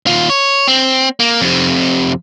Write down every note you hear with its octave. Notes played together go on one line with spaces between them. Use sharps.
D#2 F4
C#5
C4
A#3
F2 C3